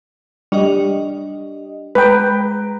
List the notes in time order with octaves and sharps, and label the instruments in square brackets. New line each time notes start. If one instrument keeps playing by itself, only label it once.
[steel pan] G3 [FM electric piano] D4 G4 D#5
[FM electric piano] G#3 A#5 [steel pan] B4 G5